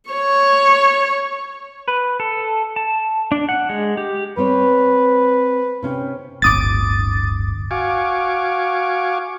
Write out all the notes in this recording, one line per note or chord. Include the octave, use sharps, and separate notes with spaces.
C#5 C#6
B4
A4
A5
D4
F#5
G#3
G4
G3 C4 B4 C#5
C3 C#4 G4
D1 G1 D6 D#6 A6
F#4 F5 G#5 C#6 D6